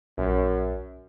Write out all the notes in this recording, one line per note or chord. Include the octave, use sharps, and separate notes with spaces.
A#1 F#2